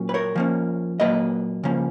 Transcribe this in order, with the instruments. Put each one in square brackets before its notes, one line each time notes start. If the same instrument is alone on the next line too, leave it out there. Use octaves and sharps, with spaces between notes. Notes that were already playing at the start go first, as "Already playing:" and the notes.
Already playing: [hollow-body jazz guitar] A#2 F#3 C#4
B4
A#4 C#5
F3 A#3 C#4
A#2 F#3 A#3 B4 D#5
C#3 F3 A#3 C#4